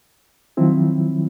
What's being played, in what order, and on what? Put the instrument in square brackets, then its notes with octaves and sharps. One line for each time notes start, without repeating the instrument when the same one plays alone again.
[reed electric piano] D#3 F3 F#3 C4 E4